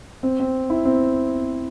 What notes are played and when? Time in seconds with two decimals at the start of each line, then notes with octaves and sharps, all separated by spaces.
0.23 C4
0.40 C4
0.70 E4
0.85 C4